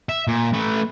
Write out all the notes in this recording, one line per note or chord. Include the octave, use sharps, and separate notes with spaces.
E5
A#2
A3 B4